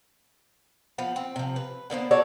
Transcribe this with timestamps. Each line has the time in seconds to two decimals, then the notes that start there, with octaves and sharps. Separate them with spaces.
0.98 F3 B3
1.16 C4
1.36 C3 F3
1.56 B4
1.90 D3 A#3 B3 C5
2.11 F#4 A4 C#5 D5